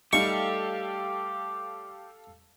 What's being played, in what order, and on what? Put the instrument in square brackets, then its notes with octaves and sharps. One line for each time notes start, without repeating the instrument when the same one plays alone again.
[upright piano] G3 A3 D#4 [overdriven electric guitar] G4 [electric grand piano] A4 F5 [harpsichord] C#6